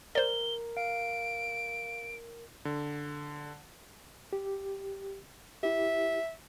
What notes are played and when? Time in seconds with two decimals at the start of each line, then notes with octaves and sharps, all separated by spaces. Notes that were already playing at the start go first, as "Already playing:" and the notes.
0.15 A#4 C5 D5 G7
0.77 F5 D7
2.65 D3
4.33 G4
5.63 E4 G4 E5